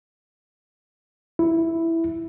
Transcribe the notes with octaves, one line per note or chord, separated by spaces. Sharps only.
E4